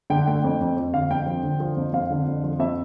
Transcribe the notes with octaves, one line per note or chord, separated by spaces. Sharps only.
D3 G5
A3 G5
F2
F2
F2
D3 F5
F2 G5
F3
D3
F3
F2
F2 F5
D3
F2
F3
F2 E5